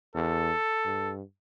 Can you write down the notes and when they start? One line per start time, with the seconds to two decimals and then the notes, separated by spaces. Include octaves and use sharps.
0.15 E2 A4
0.85 G2